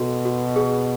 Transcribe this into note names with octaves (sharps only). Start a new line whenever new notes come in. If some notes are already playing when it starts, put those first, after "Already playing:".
Already playing: B2 F#4 A4
F#4
G#4